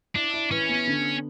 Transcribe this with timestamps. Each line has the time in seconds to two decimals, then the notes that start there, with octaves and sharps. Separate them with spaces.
0.15 D4 E4
0.34 E4
0.51 E3 C#4
0.69 B3
0.87 D3